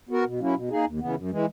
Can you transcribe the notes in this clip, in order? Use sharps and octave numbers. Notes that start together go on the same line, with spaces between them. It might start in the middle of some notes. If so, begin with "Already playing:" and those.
B3 F#4 A#4
B2
F#3 A#3 C#4 E4
B2
A#3 D#4 G#4
D#2
C#3 E3 B3
F#2
E3 G#3